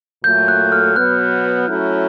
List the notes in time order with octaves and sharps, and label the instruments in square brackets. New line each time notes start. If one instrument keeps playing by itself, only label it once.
[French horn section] A#2 F#3 A3 [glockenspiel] G6
[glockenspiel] F#6
F6
[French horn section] B2 F#3 B3 [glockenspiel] F#6
[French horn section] F#3 A3 C#4 E4